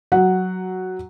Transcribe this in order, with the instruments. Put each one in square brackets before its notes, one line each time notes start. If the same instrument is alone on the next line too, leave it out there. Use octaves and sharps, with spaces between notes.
[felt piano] F#3 F#5